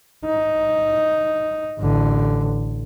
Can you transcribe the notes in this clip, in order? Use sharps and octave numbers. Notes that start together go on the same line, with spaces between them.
D#4
A1 D3